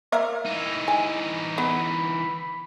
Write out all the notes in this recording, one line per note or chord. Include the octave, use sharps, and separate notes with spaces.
A#3 A#4 E5
E3 D#4
G#5
B3 B5